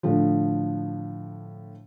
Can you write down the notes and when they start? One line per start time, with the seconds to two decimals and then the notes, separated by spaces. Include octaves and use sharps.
0.03 A2 D3 F3